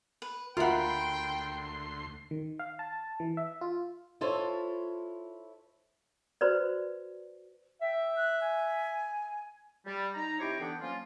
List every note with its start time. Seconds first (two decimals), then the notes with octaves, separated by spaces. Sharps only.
0.22 B4
0.57 D2 F4 A#4 E5 F#5 G5 B5 C6
2.31 D#3
2.59 F5
2.79 A5
3.20 E3
3.37 E5
3.61 F4
4.21 E4 F4 A4 C5 C#5
6.41 F#4 B4 C5 D5
7.81 E5 G5
8.16 F#6
8.41 G#5
9.86 G3
10.14 D#4 A#5
10.39 C3 E4 G4 C5 C#5 D6
10.60 D3 E3 B3 D4 G5
10.81 F3 F#3 A#3 C#4 F4